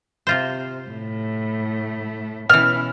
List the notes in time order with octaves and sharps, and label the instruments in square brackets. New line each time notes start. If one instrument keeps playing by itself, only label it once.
[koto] C3 F4 C5
[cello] A2 A3
[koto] B2 E3 [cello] C#4 E4 [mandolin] F6